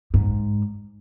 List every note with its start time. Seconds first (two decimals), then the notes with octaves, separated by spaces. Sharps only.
0.14 G#2